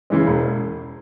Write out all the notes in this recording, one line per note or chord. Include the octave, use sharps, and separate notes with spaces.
C#3 E3 G#3
E1